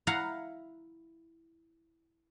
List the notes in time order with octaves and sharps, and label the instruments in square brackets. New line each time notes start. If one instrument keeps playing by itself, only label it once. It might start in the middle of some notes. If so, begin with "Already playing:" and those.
[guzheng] E4 F5 F#5 A#5